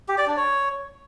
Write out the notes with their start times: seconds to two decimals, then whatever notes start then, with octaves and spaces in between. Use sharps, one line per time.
0.09 G4
0.18 D5
0.27 D4
0.37 C#5